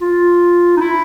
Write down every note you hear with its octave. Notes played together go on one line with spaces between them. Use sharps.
F4
D#4
E4